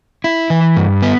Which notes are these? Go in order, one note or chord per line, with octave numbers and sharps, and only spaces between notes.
E4
E3
G2
B3